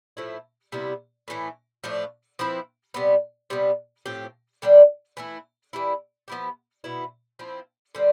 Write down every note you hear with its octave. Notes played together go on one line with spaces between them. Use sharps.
A2 F3 A3 E4
C3 G3 B3 E4
A2 E3 A3
A2 F3 A3 D4
F3 C4 E4 B4
C3 G3 B3
C3 G3 B3
A2 F3 C4 G4
D3 G3 D4
E3 A3 E4
E3 G3 B3 E4
F3 B3 E4 G4
B2 B3 E4
F3 C4 E4
D3 G3 C4